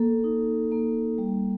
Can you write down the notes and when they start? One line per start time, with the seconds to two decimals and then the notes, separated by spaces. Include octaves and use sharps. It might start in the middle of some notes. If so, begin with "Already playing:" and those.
Already playing: A#3 A4
0.24 D#4
0.72 A#3
1.18 G3